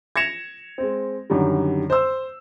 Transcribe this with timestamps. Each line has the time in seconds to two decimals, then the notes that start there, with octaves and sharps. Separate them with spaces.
0.16 G#6 A#6 C#7 E7 F7
0.78 G#3 C4
1.30 F#2 D3 D#3 G3
1.90 C5 E6